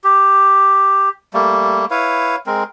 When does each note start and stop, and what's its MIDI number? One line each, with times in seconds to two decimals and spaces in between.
0.04 1.09 67
1.34 1.85 55
1.34 1.85 57
1.34 1.85 58
1.91 2.36 64
1.91 2.36 71
1.91 2.36 73
1.91 2.36 77
2.46 2.64 56
2.46 2.64 60
2.46 2.64 70